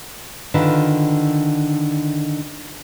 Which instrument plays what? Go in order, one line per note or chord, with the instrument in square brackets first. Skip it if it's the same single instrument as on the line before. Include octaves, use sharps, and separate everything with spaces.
[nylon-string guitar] D3 D#3 F4 B4